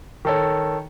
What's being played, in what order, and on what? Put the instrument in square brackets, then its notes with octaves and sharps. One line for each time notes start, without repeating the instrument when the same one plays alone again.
[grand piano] D#3 A4 C#5